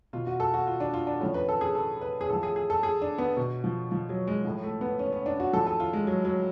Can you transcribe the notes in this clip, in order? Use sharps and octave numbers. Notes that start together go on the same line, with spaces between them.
B2 F4
F#4
A4
F#4
F4
D4
F4
D4
A2 F3 C#4
B4
A4
G#4
A4
B4
G#4
A2 F3 A4
G#4
G#4
A4
G#4
D4
B3
B2
F3
F3
F#3
G#3
A2 F3
A3
B3
C#4
C#4
D4
F#4
A2 F3 A4
A4
F4
G#3
F#3
F#3